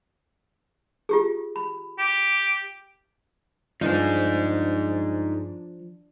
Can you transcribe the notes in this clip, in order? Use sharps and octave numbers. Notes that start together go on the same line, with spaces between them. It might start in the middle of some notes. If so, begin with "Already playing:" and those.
F4 G4 G#4
B5
G4
G2 F3 D4 D#4 G#4